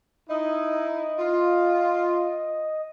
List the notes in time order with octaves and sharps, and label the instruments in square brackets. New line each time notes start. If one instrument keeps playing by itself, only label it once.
[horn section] D#4 E4 [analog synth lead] D#5
[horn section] F4